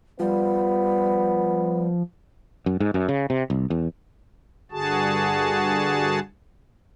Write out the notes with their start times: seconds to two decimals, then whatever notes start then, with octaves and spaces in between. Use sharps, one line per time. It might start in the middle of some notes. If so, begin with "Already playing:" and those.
0.19 F3 G3 B3
2.66 F#2
2.80 G#2
2.94 F#2
3.08 C#3
3.30 C3
3.50 C2
3.70 E2
4.71 G2 D3 F#4 G#4 A5